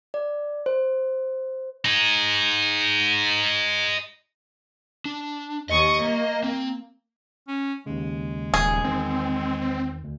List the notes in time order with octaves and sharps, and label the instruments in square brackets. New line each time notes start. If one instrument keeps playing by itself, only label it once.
[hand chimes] D5
C5
[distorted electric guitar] D#4 G#4
[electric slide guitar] D4
[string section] D#2 C#6 D#6 [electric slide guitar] D#5
[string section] A#3
[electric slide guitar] C4
[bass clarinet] C#4
[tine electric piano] D#2 C#3 [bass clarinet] G#3
[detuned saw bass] D#1 [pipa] G#4
[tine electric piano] E2 D#3 [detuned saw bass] C4
[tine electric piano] D2